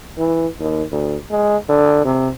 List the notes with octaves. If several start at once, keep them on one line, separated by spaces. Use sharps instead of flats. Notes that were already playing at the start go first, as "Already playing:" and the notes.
E3
D#2
D2
G#3
D3
C3